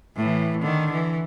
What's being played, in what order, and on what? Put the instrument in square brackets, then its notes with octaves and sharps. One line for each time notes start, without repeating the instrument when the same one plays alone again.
[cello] A2 E3
D3 D#3
E3